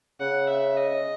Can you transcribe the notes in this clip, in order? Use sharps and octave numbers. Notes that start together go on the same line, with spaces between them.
C#3 F#5
E5
D#5